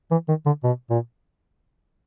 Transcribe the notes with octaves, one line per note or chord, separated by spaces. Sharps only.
E3
D#3
D3
B2
A#2